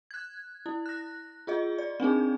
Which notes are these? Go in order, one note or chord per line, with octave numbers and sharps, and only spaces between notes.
F#6 G#6
E4
F#6 A#6
F4 G#4 D#5
D5
C4 D4 D#4 G#4